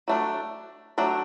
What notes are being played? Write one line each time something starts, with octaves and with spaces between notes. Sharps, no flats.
F#3 A3 D4
F#3 A3 D4